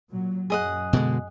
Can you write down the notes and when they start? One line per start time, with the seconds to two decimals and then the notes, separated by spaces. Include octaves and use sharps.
0.11 A#2 F#3
0.50 F#2 G#4 D#5 F#5
0.93 B2 D3 G#3